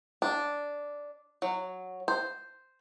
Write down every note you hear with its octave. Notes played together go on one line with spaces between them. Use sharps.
D4
F#3
C5